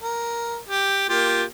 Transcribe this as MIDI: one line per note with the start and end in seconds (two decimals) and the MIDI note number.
0.03 0.58 70
0.69 1.09 67
1.09 1.44 58
1.09 1.44 65
1.09 1.44 67